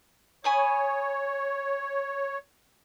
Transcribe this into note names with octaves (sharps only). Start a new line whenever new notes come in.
C#5 G#5 B5 D#6